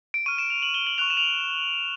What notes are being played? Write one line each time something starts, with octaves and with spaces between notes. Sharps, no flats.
D7
C#6 F6 D#7
E7
F7
F#7
G7
F#7
C#6 F#6 F7
E7
F7